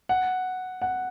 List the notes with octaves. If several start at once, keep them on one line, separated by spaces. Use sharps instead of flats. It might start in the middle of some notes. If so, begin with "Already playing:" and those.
F#5
F#5